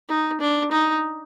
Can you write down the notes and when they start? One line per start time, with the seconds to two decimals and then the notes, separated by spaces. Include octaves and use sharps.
0.09 D#4
0.41 D4
0.71 D#4